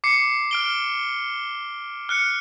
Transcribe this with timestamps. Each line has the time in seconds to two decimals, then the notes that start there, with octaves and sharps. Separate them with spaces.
0.04 D6 C7 C#7
0.51 F6 D7 G7
2.09 F6 F#6 C#7